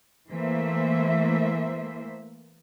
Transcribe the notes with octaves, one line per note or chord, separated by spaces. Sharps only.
E3 A3 A#3 C5 E5